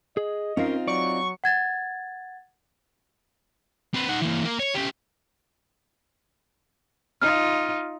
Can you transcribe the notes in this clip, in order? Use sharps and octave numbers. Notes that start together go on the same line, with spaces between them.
G#4 D#5
C4 C#4 D#4 F4 A#4 F5
F#3 D5 C#6
F#5 G#6 A6
C4 B4
D#4 F#5
E3 A#3
A#3
C#5
C#4 G4
D#4 F4 F6